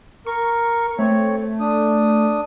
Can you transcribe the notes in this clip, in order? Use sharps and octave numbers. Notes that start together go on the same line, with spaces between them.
A#4 C#6
A3 C4 C#5
D4 D#6